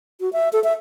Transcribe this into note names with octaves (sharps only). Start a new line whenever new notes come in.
F#4
E5
A4
E5